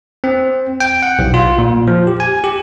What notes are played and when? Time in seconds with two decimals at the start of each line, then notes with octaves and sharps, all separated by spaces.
0.24 C4
0.80 G5
1.02 F#5
1.19 B1
1.34 F4
1.58 A#2
1.87 F3
2.07 G4
2.20 G#5
2.44 G4